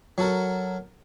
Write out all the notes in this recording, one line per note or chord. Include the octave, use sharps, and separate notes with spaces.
F#3 F#4 A4 A#4